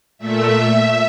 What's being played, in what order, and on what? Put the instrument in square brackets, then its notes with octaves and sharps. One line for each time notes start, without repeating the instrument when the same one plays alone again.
[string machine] A#2 A3 E5